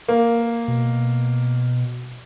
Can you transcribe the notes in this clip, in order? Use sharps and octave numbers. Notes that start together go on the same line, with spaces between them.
A#3
B2